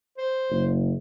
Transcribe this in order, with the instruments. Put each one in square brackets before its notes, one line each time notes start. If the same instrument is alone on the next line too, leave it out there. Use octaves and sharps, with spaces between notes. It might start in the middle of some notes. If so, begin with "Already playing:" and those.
[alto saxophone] C5
[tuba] F#1